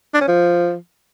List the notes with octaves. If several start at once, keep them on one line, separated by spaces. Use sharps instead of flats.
D4
C#4
F3